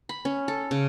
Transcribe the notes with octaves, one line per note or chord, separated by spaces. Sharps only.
B5
C#4
A4
C#3